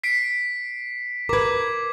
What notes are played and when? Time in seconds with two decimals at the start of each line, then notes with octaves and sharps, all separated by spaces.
0.04 B6 C7 D7
1.29 A#4 B4 D6 G#6